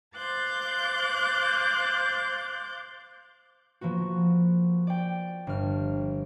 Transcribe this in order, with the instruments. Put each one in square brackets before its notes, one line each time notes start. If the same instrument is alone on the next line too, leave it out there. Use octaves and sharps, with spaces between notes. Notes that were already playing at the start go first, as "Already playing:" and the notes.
[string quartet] C5 F5 D6 F#6 G6 A6
[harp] F3 A#3 B3 F#4
D5 G5
G1 F6